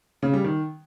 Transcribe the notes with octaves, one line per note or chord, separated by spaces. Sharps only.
C#3
G3
D#3